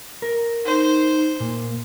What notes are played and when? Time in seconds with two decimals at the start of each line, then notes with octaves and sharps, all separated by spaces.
0.22 A#4
0.66 D#4 C5
1.40 A#2 A#3